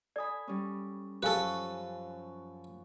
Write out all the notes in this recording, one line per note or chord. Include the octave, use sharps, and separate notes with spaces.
A4 D5 G#5 B5 D#6
G3 C#4
F#2 F3 G4 A4 B4 F5 G#5 C#6